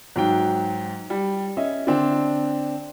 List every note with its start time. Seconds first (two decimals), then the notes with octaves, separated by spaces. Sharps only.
0.16 G#2 F#3 G5
1.10 G3
1.57 C#4 D#5 E5
1.87 D3 C4 D4